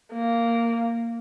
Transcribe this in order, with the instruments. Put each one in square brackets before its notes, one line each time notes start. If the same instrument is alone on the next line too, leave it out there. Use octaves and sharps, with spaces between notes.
[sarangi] A#3